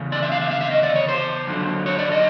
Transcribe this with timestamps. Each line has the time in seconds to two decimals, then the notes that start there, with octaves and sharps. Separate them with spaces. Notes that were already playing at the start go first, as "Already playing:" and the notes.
Already playing: E2 C#3
0.12 D5
0.23 E5
0.32 F5
0.41 E5
0.51 F5
0.61 E5
0.71 D#5
0.83 D5
0.96 C#5
1.09 C5
1.47 F2 D3 F#3
1.86 C#5
1.99 D5
2.12 D#5